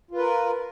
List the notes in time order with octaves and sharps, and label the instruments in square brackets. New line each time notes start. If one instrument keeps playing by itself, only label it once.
[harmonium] F4
B4
A#4